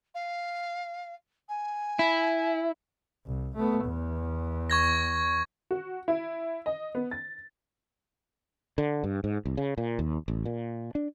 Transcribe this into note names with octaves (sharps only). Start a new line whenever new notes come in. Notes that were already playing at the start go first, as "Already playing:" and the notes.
F5
G#5
E4
C2
A3 B3
E2
C#6 G#6 A#6
F#4
E4
D#5
B3
A6
D3
G2
G#2
C2
C#3
A#2
D#2
A1
A#2
D4